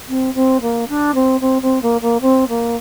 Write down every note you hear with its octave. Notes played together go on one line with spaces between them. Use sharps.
C4
C4
A#3
D4
C4
C4
C4
A#3
A#3
C4
A#3